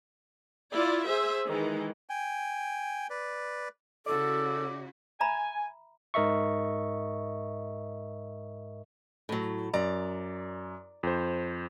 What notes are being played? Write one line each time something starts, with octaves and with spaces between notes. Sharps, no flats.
E4 F4 D5
G#4 C5 E5
D#3 E3 G#3
G5 G#5
B4 D5
C#3 E4 F#4 A4 D5
E5 G#5 A#5 B5
G#2 A#4 D#5 E5 C#6
A2 F#3
F#2 D5 A#5
F2 C5